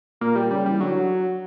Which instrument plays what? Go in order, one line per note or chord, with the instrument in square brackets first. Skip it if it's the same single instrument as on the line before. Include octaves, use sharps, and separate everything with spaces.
[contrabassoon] A#2 [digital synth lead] A#3
[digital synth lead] G3
[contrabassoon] C#3 [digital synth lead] G3
[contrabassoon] E3 [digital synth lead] G3
[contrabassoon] D3 [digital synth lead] F#3